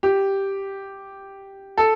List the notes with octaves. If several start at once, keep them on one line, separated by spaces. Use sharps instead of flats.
G4
A4